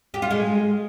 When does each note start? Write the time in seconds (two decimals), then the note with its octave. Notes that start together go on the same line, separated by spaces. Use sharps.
0.14 G4
0.22 F4
0.30 G#3